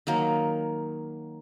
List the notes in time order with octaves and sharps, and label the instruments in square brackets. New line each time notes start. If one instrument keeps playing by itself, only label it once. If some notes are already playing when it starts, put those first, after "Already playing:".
[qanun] D#3 F#3 A#3